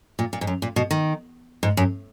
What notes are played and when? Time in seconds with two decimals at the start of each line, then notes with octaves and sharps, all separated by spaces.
0.19 A#2
0.33 A#2
0.41 G#2
0.47 F#2
0.62 A#2
0.76 B2
0.91 D#3
1.63 G#2
1.77 F#2